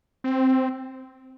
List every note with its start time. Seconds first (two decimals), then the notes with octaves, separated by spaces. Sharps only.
0.24 C4